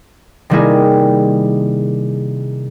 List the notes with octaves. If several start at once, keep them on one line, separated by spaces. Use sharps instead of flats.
C3 D#3 G3 A#3 E4 G#4